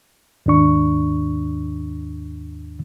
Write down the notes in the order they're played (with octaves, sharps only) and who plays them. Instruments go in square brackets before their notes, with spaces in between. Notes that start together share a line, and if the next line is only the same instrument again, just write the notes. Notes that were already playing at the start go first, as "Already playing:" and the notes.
[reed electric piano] D#2 G#2 D4 C#6